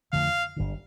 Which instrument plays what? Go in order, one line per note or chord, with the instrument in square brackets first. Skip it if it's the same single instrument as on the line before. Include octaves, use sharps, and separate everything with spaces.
[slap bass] F2 D3 F3 A3 [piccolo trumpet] F5
[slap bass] G1 G2 D3